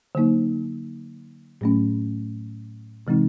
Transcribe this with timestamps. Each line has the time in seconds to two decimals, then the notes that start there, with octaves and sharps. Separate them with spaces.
0.15 D3 F#3 A#3 D#4
1.61 A2 F#3 A3 C#4
3.07 C3 E3 G#3 C4 D#4